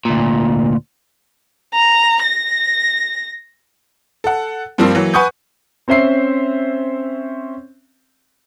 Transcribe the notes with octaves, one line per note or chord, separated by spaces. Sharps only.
D2 A#2
A#5
A#6
A4 F#5
G2 F3 G3 A#3 C4
E3 F#3 A#3
B4 F#5 G#5 C#6 D#6 G6
C4 C#4 C5 E5 C7